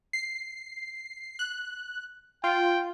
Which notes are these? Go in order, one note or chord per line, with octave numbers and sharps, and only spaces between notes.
C7
F#6
F4 G5